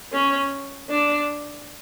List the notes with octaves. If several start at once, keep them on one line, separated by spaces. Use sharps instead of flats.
C#4
D4